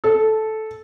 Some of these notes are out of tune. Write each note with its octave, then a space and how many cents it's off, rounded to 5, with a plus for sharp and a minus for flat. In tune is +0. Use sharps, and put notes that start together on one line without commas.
A4 -10